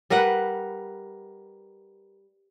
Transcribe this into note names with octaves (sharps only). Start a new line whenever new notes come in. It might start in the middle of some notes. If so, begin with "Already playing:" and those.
G3 A#4 B4 F#5